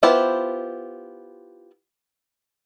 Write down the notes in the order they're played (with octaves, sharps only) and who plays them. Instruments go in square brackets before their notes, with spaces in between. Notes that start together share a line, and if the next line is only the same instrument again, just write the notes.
[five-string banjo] B3 E4 F4 G4 C5